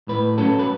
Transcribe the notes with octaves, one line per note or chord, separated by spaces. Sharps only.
A2 B4
F#3 C#4 A4
B4